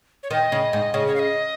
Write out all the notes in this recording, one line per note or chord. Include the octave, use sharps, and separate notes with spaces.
C#5
D#3 D#5
C#3
G#2
C#3
C#5
F5
D#5